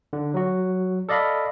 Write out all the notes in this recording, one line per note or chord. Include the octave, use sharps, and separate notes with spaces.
D3
F#3 F#4
A4 D5 D#5 F5 B5